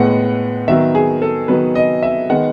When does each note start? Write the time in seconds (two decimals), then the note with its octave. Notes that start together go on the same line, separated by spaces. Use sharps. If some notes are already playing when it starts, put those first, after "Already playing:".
Already playing: A2 G#3 B3 F#5
0.68 D#3 F#3 B3 E5
0.95 G#4
1.22 A4
1.48 D#3 F#3 B3 B4
1.75 D#5
2.03 E5
2.29 D#3 G#3 B3 F#5